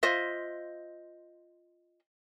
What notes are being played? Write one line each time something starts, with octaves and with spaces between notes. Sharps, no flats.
F4 C5 D#5 E5